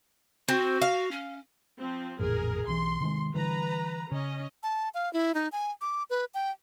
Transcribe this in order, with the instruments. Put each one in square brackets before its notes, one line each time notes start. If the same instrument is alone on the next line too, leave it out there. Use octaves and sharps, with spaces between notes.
[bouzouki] C4 [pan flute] F#4
[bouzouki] F5
[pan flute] C#4
[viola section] F3 C4
[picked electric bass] A1 F2 A#2 [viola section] G#4 A#4
[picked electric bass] B1 E3 [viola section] C6
[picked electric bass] C3 D#3 G#3
[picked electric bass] D3 E3 G3 [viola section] B4 A#5
[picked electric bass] C#3 [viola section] C#4 D#5
[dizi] A5
F5
E4
D#4
G#5
D6
B4
G5